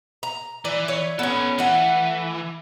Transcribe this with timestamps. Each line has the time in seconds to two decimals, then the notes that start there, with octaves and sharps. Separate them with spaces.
0.23 A#5
0.65 E3 D5
0.88 C#5
1.19 B3 C#4 A4 B4
1.59 E3 A3 F#5